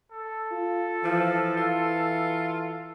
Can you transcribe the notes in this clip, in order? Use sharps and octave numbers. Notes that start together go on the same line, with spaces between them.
A4
F4
E3 F3
F4